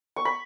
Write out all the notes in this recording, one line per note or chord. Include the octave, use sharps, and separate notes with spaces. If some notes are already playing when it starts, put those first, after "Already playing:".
C#6
B5